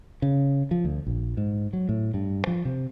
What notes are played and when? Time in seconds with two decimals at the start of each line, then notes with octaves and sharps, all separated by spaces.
0.22 C#3
0.71 F3
0.85 D2
1.07 A#1
1.37 G#2
1.73 F#3
1.89 A2
2.14 G2
2.47 F3
2.65 C3